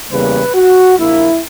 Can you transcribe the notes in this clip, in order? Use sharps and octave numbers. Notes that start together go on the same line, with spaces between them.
E2 C#3 G3 A#3 B4
F#4
A#1 A#2 A#3 E4